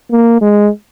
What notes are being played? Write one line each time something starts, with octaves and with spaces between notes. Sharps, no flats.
A#3
G#3